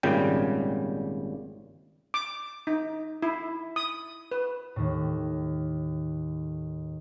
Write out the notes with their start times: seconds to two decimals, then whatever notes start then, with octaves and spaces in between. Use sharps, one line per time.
0.03 G#1 A#2 C#3 G3 G5
2.14 D6
2.67 D#4
3.22 E4
3.76 D#6
4.31 B4
4.76 D#2 A2